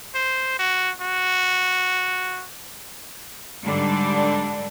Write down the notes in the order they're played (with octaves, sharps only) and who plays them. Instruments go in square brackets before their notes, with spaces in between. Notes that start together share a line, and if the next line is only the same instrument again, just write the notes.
[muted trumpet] C5
F#4
F#4
[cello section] G#2 D3 G3 D4